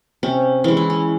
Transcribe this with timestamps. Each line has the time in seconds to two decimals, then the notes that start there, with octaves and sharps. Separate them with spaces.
0.23 C3 C#4
0.64 E3 G#3 C#4
0.77 E4
0.90 C#4